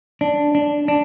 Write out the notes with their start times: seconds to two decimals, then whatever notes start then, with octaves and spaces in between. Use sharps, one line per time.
0.21 D4
0.55 D4
0.88 D4